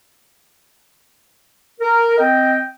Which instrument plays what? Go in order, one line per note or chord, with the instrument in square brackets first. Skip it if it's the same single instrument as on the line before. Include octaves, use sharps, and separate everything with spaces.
[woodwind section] A#4
C4 D#5 G5